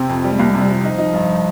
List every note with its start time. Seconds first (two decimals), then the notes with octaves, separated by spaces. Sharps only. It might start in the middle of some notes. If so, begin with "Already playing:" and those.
Already playing: C3 C4
0.09 F2
0.24 G3
0.32 G#3
0.39 C2 A#3
0.50 C3 G#3
0.61 G3
0.68 C3 F3
0.84 D#4
0.98 D#4
1.14 G2